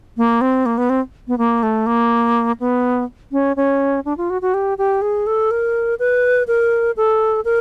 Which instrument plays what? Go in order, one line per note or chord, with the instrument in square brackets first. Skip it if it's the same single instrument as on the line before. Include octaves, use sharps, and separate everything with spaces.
[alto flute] A#3
C4
A#3
B3
C4
B3
A#3
A3
A#3
B3
C#4
C#4
D4
F4
F#4
F#4
G4
G4
G#4
A4
A#4
B4
A#4
A4
A#4